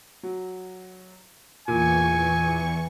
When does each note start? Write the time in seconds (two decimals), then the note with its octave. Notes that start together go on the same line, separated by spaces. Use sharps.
0.23 F#3
1.68 E2 A#2 E3 G#5 C#6